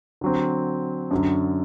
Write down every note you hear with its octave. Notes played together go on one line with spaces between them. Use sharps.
D3 F#3 C4
F#2 D3 F#3